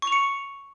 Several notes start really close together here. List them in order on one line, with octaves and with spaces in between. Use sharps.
C#6 F7 C#7